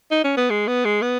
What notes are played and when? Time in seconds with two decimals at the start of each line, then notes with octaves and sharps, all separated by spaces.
0.11 D#4
0.24 C#4
0.37 B3
0.50 G#3
0.67 B3
0.85 G#3
1.02 B3